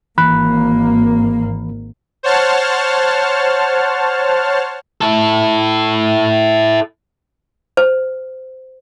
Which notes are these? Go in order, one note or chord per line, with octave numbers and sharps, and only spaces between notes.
G#1 E3 A#3 B5 F#6
C5 C#5 F#5 A5 F6
E4 A4
C5